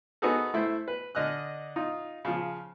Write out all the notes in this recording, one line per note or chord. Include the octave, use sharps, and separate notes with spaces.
B3 D#4 F#4 G#4 A4
A3 E4 C5
B4
D3 D#5 F6 F#6
D#4 F4
C#3 F3